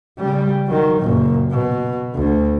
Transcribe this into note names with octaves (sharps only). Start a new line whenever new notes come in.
C#3 G3
D#3 F#3
F#1 A#2
B2
D2